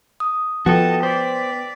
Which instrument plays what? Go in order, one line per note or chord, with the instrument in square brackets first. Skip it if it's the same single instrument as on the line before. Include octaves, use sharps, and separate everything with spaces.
[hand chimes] D#6
[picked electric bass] F3 [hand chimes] B3 B4 G5 [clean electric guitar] F#4 A4 [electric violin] D#5 A5
[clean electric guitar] C5 [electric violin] D5 B6